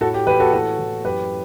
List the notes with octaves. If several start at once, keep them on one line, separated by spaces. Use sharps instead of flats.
A2 F#4 A4
G4
E3 G4 B4
F#4 A4
A2 F#4 A4
E3
F#2 G4 B4